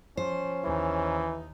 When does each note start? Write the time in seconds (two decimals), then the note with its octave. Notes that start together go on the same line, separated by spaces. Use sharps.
0.17 F3 C#4 C5
0.64 D#2 E3 D#4